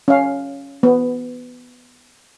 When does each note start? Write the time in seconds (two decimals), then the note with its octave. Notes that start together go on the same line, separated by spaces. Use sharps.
0.08 C#4 F5
0.83 B3